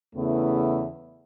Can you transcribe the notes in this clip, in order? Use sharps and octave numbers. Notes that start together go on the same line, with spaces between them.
E2 C#3 A3 B3 E4